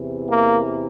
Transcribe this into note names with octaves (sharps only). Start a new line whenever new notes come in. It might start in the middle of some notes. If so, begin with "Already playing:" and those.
Already playing: E2 C3 E3
A#3